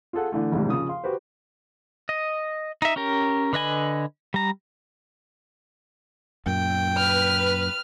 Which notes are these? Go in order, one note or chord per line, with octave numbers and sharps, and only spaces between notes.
F4 G#4 A4 F#5
D3 E3 A3
A#1 D#2 G#2 C3
C#3 F3 D#6
F5 C6
F#4 G4 B4 C5
D#5
D#4 E5
C#4 G4 A#4
D3 B4 D#5 G#5 B5
G3 A#5
F#2 A#2 G5
B4 F6